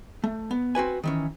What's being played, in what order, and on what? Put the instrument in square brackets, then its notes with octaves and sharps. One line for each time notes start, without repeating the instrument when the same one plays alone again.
[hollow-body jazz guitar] A3
B3
C4 F#4 B4 G#5
D#3 E3 C#4